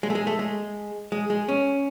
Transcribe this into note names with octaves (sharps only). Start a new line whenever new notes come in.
G#3
A3
G#3
A3
G#3
G#3
G#3
C#4